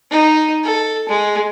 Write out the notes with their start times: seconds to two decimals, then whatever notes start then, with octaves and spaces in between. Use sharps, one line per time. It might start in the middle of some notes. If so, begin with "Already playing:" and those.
0.11 D#4
0.64 A4
1.08 G#3